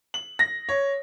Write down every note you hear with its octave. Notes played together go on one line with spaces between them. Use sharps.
F#7
A#6
C#5